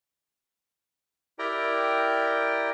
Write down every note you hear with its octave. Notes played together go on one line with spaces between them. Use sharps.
E4 G4 A#4 D5 G5 A#5